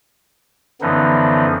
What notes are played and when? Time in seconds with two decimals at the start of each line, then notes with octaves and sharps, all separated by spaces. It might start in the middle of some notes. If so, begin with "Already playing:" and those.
0.81 F#2 D3 E3 F3 B3 D#4